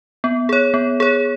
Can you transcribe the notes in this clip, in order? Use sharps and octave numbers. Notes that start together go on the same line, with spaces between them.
B3
G#4 C#5
B3
G#4 C#5